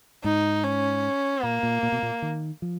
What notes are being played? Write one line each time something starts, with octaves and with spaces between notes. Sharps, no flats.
G#2 D#4
C#4
A#2 A#3
A#2
A#2
B2
A#2
D#3
F3